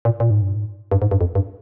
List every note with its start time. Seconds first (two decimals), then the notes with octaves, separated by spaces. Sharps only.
0.05 A#2
0.20 A#2
0.30 G#2
0.42 G2
0.54 G#2
0.92 G2
1.02 G#2
1.11 G2
1.21 F2
1.35 G2